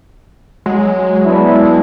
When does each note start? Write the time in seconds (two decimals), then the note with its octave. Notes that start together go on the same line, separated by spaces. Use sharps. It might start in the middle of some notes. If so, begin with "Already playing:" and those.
0.66 F#3 G#3
1.25 B3 D4 E4